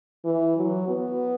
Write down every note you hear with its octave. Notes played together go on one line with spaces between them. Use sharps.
E3
F#3
B3